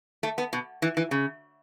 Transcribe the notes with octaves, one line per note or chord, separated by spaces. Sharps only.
A3
B3
B2
E3
E3
C#3